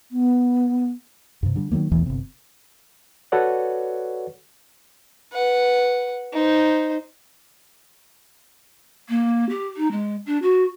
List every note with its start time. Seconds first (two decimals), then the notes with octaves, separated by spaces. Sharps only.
0.11 B3
1.43 G2 C3
1.56 D3 G3
1.72 D#3 F#3 G3 A#3
1.92 E1 A1 E2 E3
2.06 G1 C3
3.32 F#4 A4 B4 C#5 D5 F#5
5.32 B4 F#5
6.33 D#4 C5
9.09 A#3
9.49 G4
9.77 D#4
9.91 G#3
10.26 D4
10.42 F#4